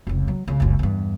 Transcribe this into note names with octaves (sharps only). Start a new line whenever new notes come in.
F1 C#2
F#3
C#2 C#3
F#1 C#2
E2 G2